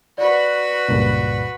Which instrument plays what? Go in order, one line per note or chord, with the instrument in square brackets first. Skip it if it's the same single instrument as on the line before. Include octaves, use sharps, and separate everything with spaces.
[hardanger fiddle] F#4 B4 [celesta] D5
[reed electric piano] C#2 G2 A#2